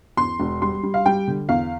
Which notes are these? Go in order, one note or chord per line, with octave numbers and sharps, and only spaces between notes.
E2 C6
E1
G3 C6
G3
F5
G3 G5
D3
E2 F5